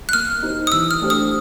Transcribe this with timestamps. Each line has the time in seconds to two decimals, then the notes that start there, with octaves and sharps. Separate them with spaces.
0.09 F#6
0.13 A#3 F6
0.43 D#4 G4 C5
0.67 D#6
0.72 E3 E6
0.91 F6
1.00 A3 D4 G4 C5
1.10 D#6